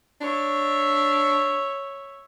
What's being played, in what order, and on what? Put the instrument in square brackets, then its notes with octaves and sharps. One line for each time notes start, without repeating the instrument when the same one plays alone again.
[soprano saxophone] D4 [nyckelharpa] C#5 E5